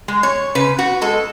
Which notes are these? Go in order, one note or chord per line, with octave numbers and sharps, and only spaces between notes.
G#3
C#5
C#3 B4
F#4
G#3 A4